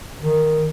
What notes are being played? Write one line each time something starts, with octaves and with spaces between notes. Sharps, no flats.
D#3